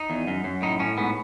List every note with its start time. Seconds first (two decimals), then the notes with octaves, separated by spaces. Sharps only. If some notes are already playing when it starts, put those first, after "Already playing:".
Already playing: D#4
0.10 E2
0.27 F#2
0.44 F#2
0.62 A2 D#4
0.79 A2 C#4
0.97 G#2 B3